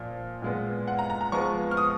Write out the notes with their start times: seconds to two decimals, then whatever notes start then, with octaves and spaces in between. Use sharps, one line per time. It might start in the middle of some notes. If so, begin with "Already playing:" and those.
Already playing: A#2 F3
0.42 A#2 G#3 B3
0.87 F#5
0.99 A#5
1.10 A#5
1.21 A#5
1.32 F3 G#3 B3 C#6
1.71 F6
1.77 D#6